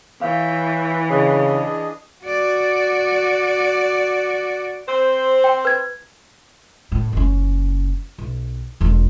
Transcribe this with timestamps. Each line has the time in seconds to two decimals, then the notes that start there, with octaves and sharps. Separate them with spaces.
0.21 E3 C#5 E5 F5 G5
1.10 C#3 D4 G#4 D#5
2.24 F#4 D5
4.88 C4 C5
5.44 G5
5.65 B4 G#6
6.92 A2
7.13 F#1 C#4
8.18 B1
8.81 E1 F2